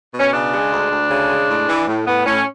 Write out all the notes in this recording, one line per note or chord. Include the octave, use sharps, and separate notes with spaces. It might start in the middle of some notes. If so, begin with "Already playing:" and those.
B2 C#4
C#3 D4
G#3
D2
D2
C#3
G#3
A2
E3
A2
A2 B3
A2 C#4